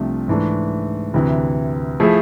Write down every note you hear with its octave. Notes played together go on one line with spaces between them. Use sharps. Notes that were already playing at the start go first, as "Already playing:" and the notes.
Already playing: C2 C3 F3 A3 D4
G#2 E3 A3 D4
D2 C3 E3
F3 A3 E4 G#4